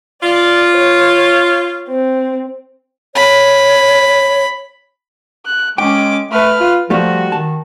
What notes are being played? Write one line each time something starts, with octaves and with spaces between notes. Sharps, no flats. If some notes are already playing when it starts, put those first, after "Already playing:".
F4 D5
C#5
C4
C#5 B5
F#6
G#3 C#4 G5 D6
A3 B4 F6
F4
F3 G3 A3 F#4 F5
D#3 A5